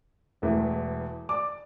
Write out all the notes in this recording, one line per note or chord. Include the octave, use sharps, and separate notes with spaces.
E1 E2 E3 A3
D5 D6